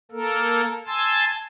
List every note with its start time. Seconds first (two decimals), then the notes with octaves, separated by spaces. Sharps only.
0.11 A#3 A4 A#4
0.87 G#5 A5 C6 E6 A6